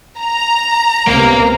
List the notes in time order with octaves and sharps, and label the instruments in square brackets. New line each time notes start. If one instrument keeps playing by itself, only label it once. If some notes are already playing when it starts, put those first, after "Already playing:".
[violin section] A#5
[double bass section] C#2 C3 B3 [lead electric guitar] A#3 A#4